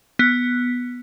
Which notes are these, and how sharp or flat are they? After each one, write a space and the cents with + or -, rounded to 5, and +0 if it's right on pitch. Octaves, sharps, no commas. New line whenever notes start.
B3 -5